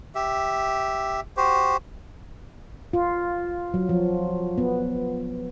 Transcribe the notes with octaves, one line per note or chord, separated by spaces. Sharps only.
G4 E5
F#4 G4 C5
F4
F#3
F3
B3